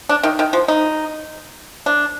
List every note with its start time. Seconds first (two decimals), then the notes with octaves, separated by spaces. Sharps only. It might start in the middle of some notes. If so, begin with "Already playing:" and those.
0.09 D4
0.23 D#3
0.39 D#3
0.53 F3
0.68 D#4
1.86 D4